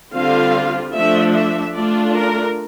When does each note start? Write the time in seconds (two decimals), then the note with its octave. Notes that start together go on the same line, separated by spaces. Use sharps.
0.13 D3 G3 C4 F4 F5
0.95 F3 A3 D4 E5
1.35 E5
1.75 A3 D4 F4 D5
2.16 A#4